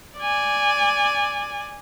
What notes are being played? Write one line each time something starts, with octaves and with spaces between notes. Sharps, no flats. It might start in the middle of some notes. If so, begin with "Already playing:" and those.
D5 G#5